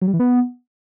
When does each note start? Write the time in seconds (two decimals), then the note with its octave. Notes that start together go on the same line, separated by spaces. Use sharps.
0.02 F#3
0.08 G3
0.14 E3
0.20 B3